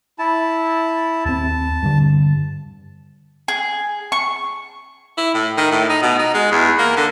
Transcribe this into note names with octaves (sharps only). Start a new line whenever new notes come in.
E4 A5
D#2 C4 A5
G2 D3
G#4
C#6
E4
A2
D#3
A2
D#4
B2
D#4
G#3
E2
A#3
D3